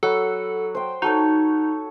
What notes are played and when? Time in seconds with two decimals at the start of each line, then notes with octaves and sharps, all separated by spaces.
0.03 F#3 A4 F#5 B5
0.75 C5 G5
1.02 D#4 F#4 A4 C#5